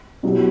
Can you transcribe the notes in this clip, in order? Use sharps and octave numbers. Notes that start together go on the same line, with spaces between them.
B2 F#3 B3 E4 G4